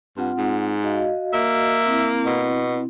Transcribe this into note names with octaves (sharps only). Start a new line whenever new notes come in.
G2 C4 F4 F#5
G#2
F#4 D#5 F5
A#3 E5
C4 E4
B2